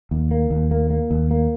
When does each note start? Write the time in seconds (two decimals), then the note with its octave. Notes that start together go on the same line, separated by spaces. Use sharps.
0.11 D#2
0.31 A#3
0.51 D#2
0.71 A#3
0.91 A#3
1.11 D#2
1.31 A#3